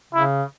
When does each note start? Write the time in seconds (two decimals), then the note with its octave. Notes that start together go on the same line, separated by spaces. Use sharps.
0.13 C#3 E4